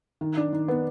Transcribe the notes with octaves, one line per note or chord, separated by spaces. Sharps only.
D#3
D4
D#3
B3